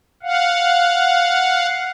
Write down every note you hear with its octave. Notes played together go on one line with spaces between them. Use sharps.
F5 F#5